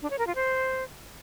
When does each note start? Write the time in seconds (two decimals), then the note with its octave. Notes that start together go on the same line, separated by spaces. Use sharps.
0.02 D4
0.10 C#5
0.19 A#4
0.27 F4
0.35 C5